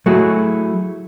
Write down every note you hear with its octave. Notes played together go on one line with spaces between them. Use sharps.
F#3 A3 E4 F#4 G#4